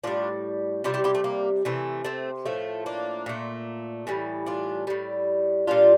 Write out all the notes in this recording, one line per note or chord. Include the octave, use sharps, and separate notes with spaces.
A2 G3 D4 F4
C3 G3 D4 F4
E4 G4
E4 G4
A3
A#3
C3 E3 A3
A3 C4
A2 F3 A3
A#3 D4
A#2 A3
A2 E3 G3
D4 F4
A2 G3
A#2 G3 D4 F4